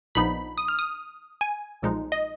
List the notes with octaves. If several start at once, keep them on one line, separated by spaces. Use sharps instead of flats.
A#1 A#2 F3 B3 D#4 B5
D#6
F6
D#6
G#5
B1 A#2 F3 G#3 D#4
D#5